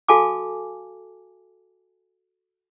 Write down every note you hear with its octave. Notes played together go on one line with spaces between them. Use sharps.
F#4 A4 F5 G#5 A5 D6